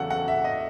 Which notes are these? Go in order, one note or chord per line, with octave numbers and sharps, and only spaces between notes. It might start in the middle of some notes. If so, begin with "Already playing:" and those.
Already playing: E2 C#3 F#3 C#4 A4 F#5
F#5
E5
D#5